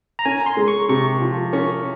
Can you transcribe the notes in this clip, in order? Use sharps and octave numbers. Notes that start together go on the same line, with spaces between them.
A#5
C#4 G#5
A#5
C6
G#3
C#6
C3 C#6
F3
C#4 C#6